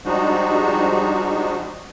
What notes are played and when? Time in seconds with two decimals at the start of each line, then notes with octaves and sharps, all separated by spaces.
0.05 F3 G3 G#3 D4 D#4 F#4